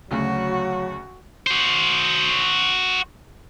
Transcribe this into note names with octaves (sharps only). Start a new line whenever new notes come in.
D2 C#3 F#3 F#4
F#4 C5